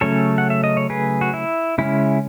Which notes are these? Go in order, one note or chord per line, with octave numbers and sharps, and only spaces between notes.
C#3 F#3 A3 C#4 A4 C#5
F#5
E5
D#5
C#5
G#4 B4
F#4
E4
C#3 G#3 C#4 E4